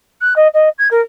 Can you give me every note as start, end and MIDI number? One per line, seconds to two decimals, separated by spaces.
0.21 0.34 90
0.36 0.48 75
0.54 0.69 75
0.79 0.88 92
0.91 1.01 70